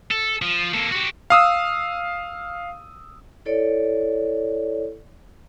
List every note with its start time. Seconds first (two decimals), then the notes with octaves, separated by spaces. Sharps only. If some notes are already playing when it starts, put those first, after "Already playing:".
0.11 A4
0.42 F3
0.74 A#3 A4
0.91 F#4 G4
1.30 F5 D#6 E6
3.46 E4 A4 C#5 D5